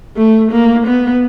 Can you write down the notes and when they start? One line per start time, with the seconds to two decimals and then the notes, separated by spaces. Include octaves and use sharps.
0.16 A3
0.51 A#3
0.87 B3